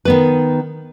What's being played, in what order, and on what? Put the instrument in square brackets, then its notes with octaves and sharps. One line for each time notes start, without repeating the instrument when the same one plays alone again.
[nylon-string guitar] D#3 B3 B4